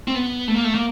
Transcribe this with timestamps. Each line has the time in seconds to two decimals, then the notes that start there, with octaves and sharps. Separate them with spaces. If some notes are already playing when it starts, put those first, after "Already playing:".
0.08 C4
0.15 B3
0.48 A3
0.54 A#3
0.64 A3
0.75 A#3